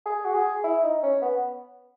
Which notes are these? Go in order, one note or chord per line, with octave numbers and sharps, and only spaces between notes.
G#4
F#4
G#4
E4
D#4
C#4
B3